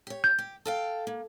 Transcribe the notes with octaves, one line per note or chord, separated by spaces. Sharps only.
G4 C#5
G6
G4
A4 F5 G5
A#3